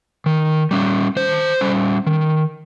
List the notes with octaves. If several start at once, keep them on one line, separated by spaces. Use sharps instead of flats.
D#3
G3 C#4
D#3 C5
G3 C#4
D#3